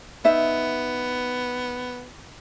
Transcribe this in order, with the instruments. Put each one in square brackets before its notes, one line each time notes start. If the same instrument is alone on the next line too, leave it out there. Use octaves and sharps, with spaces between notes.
[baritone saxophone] B3 [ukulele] D#4 E5